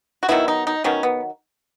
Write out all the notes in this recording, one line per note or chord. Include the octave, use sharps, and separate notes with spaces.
F#4
D#3 F#3 B3 E4
D#4
D#4
D#3 F#3 B3 C#4
B3